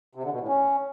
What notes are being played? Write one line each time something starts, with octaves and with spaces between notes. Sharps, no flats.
C3
D3
B2
A2
C#4